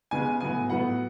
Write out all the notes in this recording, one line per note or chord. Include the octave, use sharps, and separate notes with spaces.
C#3 G#3 B3 G#5
A2 F#3 B3 G#5
A2 F#3 B3 F#5